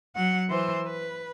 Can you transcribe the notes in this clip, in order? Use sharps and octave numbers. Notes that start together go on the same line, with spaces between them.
F#3 F#5
E3 C5
B4